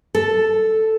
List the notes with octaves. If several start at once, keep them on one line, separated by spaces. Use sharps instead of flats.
A4